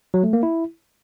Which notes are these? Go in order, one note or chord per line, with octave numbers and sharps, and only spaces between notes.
F#3
A3
A#3
E4